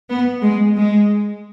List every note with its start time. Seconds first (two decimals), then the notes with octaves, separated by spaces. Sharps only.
0.09 B3
0.43 G#3
0.76 G#3